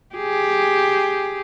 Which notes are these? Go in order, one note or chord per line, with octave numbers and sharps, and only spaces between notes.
G4 G#4